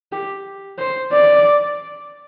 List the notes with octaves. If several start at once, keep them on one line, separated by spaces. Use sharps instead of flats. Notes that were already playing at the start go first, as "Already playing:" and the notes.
G4
C5
D5